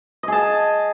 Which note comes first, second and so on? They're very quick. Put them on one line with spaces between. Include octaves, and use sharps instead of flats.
D#5 G#4 A5